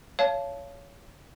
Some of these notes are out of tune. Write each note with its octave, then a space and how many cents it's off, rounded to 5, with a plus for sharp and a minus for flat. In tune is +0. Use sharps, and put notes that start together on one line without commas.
C#5 +20 F5 -25 A5 -15